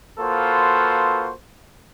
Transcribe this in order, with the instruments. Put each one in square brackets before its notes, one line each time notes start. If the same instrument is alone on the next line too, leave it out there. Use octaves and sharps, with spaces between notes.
[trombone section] A#3 F4 F#4 A4 B4 C5